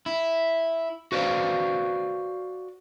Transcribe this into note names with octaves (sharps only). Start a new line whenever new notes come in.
E4
F#4 B4 C5 D5 F5